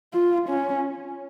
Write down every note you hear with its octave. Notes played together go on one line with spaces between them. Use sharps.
F4
C#4